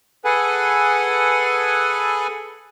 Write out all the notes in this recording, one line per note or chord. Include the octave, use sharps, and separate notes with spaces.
G#4 A4 B4 F#5 G#5